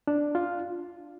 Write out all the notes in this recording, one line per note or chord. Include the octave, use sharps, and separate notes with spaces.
D4
F4